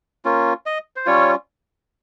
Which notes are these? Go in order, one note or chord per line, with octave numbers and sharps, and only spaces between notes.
A#3 C#4 F4
D#5
C5
G3 C#4 F4 C#5